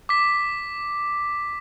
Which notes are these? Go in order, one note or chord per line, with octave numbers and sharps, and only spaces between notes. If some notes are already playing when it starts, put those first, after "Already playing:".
D6 B6